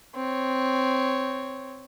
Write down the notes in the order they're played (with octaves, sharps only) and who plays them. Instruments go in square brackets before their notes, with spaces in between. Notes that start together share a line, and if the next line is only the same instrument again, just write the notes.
[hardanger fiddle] C4 C#5